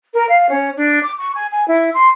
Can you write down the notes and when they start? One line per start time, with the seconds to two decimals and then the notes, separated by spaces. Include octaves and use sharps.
0.13 A#4
0.28 F5
0.50 C#4
0.76 D4
1.02 D6
1.17 C#6
1.34 G#5
1.51 G#5
1.66 E4
1.93 C6